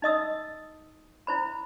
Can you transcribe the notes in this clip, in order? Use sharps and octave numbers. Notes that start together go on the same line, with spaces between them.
D#4 D#5 D#6 E6
E4 C5 B5